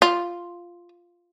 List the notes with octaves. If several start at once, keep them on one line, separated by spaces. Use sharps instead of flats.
F4